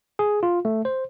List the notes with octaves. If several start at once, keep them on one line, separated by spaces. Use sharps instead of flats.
G#4
F4
A3
C5